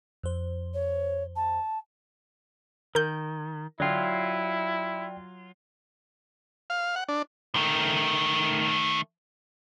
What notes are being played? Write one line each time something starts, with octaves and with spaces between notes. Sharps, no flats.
F2 C5
C#5
A5
D#3 A#4 G6
D3 F#3 E4 F4 D5 G5
F5
F#5
D4
D#3 A3